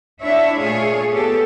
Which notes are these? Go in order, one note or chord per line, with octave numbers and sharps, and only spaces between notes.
D4 E4 C#5 E5
A#2 A3 F4 G#4 C#5
B3 G4 A4